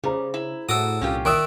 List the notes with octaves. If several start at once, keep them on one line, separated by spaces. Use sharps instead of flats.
C#3 G3 G#4 C5 A#5
E4
A2 F#4 A4 D6 D#6
C2 A#2 C#4 F4 G4
D#3 D5 E5 D#6 F#6